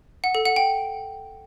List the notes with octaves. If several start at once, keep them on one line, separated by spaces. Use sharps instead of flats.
F#5
A4
F#5
G5